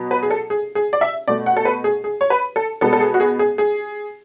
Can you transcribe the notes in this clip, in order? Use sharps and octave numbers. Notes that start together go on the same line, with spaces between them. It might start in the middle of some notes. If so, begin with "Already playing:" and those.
Already playing: B2 F#3 B3
B4
G#4
A4
G#4
G#4
D5
E5
B2 A3 D5
F#5
A4
B4
G#4
G#4
C#5
B4
A4
B2 G#3 B3 A4
A4
G#4
F#4
G#4
G#4
G#4